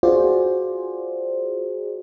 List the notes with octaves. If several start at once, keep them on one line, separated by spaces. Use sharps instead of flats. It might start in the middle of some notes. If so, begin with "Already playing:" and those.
F4 F#4 G#4 C5 D5